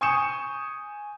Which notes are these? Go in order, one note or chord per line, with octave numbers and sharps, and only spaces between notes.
G#5 C#6 D#6 G6 C#7 E7